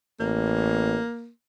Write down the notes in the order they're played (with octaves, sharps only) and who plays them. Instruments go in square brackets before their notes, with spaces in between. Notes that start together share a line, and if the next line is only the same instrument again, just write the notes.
[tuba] A1 [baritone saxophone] A#3